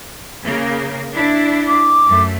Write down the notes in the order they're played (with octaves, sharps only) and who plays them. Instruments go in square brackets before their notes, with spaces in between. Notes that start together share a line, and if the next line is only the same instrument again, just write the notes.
[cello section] C#3 A#3
D4 E4
[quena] D6
[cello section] F#2 A3